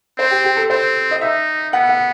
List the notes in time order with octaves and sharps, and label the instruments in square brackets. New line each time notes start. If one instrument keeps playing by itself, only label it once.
[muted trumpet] C4 [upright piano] C5
[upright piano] G4
G4
A4
[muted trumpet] C4 [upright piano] C5
[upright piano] D#5
[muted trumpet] D#4 [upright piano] E5
[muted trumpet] B3 [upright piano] F#5
[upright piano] F#5